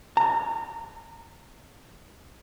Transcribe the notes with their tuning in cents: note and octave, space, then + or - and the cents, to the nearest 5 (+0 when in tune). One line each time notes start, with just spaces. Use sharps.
A#5 -25